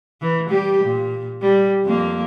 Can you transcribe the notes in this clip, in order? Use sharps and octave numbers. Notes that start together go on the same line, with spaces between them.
E3
G3 G4
A#2
G3
F2 A#3